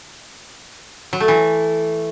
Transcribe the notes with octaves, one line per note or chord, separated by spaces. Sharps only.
F#3
A3
E3